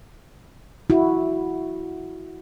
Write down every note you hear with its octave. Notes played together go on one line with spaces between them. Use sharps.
E4 F#4